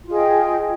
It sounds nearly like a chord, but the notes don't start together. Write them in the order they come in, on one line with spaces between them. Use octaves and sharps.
F4 G#4 D#5 G5